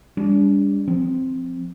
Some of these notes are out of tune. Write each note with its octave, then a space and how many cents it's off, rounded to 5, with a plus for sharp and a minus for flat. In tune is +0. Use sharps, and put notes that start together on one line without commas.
G3 +35 D4 -35
F3 +0 C4 -5